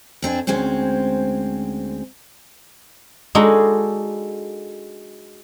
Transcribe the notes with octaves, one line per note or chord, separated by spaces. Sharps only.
F2 C4 D4 G#5
D2 G#3 C4 C#4 C5
G#3 D4 D#4 F#4 G#4 A4